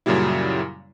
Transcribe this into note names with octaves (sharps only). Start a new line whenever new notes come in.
F#2 A#2 C#3 F#3 G3 E4